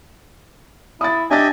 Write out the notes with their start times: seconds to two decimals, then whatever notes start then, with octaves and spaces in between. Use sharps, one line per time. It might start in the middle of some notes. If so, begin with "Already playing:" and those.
1.01 E4 D#6 A6
1.31 D4 G4 D#5 E5 G#5 A6